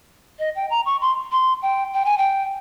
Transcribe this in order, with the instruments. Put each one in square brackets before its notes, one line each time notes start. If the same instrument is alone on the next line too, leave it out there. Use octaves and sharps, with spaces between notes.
[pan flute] D#5
G5
A#5
C#6
C6
C6
G5
G5
G#5
G5